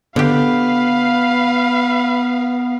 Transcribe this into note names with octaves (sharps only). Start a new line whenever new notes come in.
D3 B3 G4 B4 F5